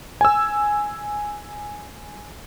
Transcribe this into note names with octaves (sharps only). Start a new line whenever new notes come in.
G#5 E6